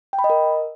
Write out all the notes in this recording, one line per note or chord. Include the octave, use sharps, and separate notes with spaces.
G5
B5
D#5
A#4